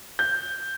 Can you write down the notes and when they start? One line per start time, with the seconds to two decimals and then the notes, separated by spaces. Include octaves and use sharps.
0.19 G6